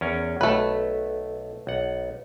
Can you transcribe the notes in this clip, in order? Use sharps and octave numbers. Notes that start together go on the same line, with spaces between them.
E2 C#4 A#4
B1 A3 B4 A5
B1 F#5